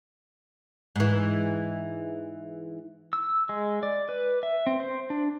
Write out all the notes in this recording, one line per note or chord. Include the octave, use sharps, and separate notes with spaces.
G#2 E3
E6
G#3
D5
B4
E5
C4
C5
D4